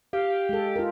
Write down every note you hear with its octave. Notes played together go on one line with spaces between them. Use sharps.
G4 F5
G#3 A4
F4 A#4